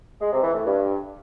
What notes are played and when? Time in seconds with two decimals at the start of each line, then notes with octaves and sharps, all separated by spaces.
0.21 G#3
0.32 C3
0.43 E3
0.54 A2
0.65 G2